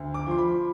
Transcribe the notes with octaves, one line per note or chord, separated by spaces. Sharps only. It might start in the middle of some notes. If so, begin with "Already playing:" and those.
Already playing: D2
D6
F3 C6
B5